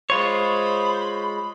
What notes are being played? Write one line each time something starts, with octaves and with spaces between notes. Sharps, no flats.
G#3 F4 C5 C#5 B5